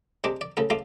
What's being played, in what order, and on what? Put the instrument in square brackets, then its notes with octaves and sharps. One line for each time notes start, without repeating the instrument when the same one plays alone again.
[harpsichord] C3 G#3 D4 D6
D5
D2 C#3 A4
C#2 A3 F4 F5 D6